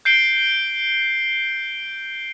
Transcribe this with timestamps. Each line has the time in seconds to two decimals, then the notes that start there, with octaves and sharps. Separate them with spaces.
0.05 G6 C7 D7 G7